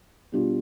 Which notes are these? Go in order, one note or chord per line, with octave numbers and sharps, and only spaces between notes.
B2 G3 D4 F4